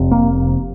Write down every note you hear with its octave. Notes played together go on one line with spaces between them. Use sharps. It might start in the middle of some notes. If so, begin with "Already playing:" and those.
Already playing: F1 F2 C3
A#3